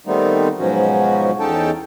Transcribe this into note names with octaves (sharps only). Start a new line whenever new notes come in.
D#3 G3 A3 B3 C4 D#4
G#2 B2 F3 F#3 C#4 F#4
E2 C#4 D#4 A4 G5 A5